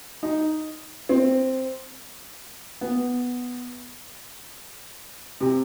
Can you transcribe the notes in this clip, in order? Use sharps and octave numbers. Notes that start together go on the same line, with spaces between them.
D#4
C4
B3
C3